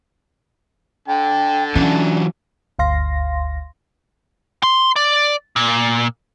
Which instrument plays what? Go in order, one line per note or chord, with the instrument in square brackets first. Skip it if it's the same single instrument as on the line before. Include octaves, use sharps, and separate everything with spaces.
[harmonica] D3 A5 [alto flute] G5
[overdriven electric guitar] E3 F#3 [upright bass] C#4 [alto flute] D4
[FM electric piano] G1 D2 F5 C6 A#6
[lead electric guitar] C6
D5
A#2